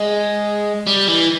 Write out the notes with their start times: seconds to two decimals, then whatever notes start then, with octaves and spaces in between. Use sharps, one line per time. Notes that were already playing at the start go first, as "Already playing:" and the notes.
Already playing: G#3
0.87 G3
1.08 E3